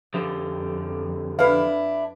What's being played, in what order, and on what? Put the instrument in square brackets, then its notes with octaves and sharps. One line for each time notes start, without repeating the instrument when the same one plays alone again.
[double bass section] F2 [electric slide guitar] D3 F3 G4
[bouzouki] D4 E4 [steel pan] B4 F5